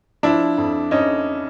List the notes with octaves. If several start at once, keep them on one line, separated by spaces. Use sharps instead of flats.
F3 D4 E4
F2
F2 C#4 D#4